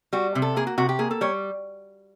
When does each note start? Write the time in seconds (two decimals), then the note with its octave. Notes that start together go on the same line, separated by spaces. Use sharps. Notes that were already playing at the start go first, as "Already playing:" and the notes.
0.13 G3 F#4
0.35 C3
0.42 A4
0.56 A#3 G#4
0.67 F#4
0.78 C3 F#4
0.89 G4
0.99 A#3 G#4
1.11 A4
1.21 G3 C#5